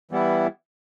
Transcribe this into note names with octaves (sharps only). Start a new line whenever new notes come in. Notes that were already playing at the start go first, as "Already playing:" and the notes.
E3 G3 B3 E4